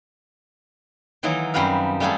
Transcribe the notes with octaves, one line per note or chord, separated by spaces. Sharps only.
D#3 E3 F#3 A#3 D#4
F#2 G3 C4 F#4 B4 F5
G3 A3 F4 F#4 G#4 A4